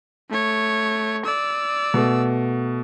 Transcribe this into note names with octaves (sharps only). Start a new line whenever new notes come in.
A3 C#5
D5 E6
B2 A3